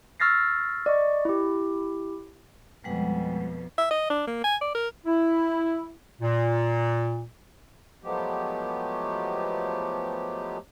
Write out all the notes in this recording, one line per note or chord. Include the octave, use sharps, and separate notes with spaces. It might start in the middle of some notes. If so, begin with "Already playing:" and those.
C#6 E6 F6 A6 A#6 C7
D5 D#5 C#6
E4 G4
F2 B2 G3 G#3 F#5
E5
D#5
D4
A#3
G#5
D5
A#4
E4
A#2
F3 F#3 G#3 A3 B3 G4